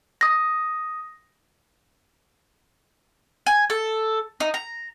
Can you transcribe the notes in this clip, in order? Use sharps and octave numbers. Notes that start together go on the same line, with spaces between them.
D#6 A#6
G#5
A4
D#4
A#5